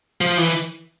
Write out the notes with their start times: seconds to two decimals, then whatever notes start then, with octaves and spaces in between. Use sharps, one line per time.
0.21 F3
0.38 E3